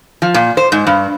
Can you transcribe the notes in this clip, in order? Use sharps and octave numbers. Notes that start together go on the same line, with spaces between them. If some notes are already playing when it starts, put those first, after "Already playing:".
F3
A#2
C5
G#2
G2